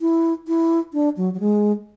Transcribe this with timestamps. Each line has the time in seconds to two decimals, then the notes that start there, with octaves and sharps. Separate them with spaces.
0.01 E4
0.48 E4
0.93 D4
1.17 F#3
1.34 F#3
1.40 G#3